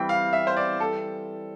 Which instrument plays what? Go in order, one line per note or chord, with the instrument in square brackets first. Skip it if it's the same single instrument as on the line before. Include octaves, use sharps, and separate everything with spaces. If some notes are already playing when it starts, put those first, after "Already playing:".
Already playing: [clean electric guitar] E3 G3 C4 [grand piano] G5
[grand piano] F5
E5
C5
D5
A4